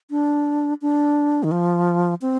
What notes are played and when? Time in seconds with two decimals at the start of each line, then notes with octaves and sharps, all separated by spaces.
0.11 D4
0.82 D4
1.43 D#3
1.51 F3
2.22 C4